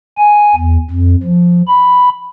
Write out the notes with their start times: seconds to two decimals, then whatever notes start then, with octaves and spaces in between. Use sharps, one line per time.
0.18 G#5
0.56 E2
0.91 F2
1.23 F3
1.68 B5